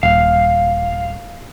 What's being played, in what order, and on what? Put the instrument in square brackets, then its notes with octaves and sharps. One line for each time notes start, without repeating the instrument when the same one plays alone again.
[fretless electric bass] D#1 [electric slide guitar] F5